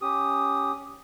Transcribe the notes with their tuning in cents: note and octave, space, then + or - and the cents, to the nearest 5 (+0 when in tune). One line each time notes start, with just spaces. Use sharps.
C#4 +0 G4 +0 D#6 +0